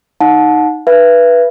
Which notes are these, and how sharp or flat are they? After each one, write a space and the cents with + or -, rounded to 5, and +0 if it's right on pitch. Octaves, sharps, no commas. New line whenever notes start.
D#4 +0 F#5 -30 A5 -25
B4 -10 E5 +40